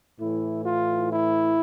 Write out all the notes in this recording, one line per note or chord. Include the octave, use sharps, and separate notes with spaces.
A2 E3 E4
F4
E4